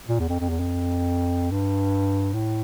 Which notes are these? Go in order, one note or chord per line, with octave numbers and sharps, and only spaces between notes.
A#2
E2
F2
F2
E2
F2
G2
A2